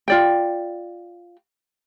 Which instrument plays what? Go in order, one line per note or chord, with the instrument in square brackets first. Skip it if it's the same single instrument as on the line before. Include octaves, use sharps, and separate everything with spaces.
[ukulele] F4 D5 G5